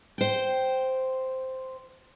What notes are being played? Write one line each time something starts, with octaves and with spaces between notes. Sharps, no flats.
C5 G5